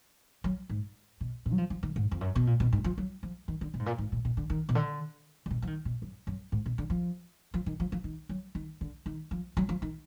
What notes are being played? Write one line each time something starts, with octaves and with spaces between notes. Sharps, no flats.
F#3
G#2
B2
A#2
F#3
F3
F3
D#3
G#2
F2
F#2
B2
A#2
B2
G#2
F3
F#3
F3
D#3
D3
B2
G#2
A#2
G#2
A#2
B2
D3
D#3
B2
D3
D3
B2
F3
D#3
B2
F#2
F#2
G#2
B2
D3
F3
F3
D#3
F3
F3
D#3
F#3
D#3
D3
D#3
F3
F#3
F3
D#3